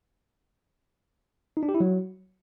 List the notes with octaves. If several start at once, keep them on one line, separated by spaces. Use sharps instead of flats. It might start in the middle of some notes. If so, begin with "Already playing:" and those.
D#4
D4
G4
E4
F#3